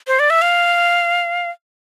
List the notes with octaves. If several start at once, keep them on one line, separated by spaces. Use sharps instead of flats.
C5
D5
E5
F5